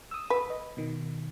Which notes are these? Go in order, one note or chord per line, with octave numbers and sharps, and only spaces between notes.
D#6 E6
B4
D#5
B2 D#3